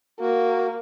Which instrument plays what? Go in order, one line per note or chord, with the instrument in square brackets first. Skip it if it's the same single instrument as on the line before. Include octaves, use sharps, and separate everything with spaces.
[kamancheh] A#3 [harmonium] F#4